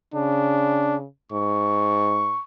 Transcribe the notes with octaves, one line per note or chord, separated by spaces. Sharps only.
C#3 D4
G#2 C#6